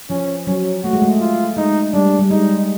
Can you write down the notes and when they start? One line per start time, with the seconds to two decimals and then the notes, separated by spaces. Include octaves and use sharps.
0.10 F3 C#4
0.47 F#3 C#4
0.83 A3 F#4
0.93 G#3
1.02 A3
1.20 F4
1.57 G#3 D#4
1.93 G3 D4
2.19 G3
2.31 G#3 D#4